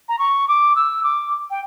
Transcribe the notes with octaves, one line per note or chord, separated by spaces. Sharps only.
A#5
C#6
D6
E6
D6
G5